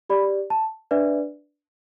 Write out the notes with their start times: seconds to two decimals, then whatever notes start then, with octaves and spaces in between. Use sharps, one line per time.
0.10 G4 D5 B5
0.50 A5
0.91 D4 B4 D5 E5